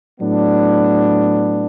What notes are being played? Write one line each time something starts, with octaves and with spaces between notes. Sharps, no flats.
A2 F#3 B3 D4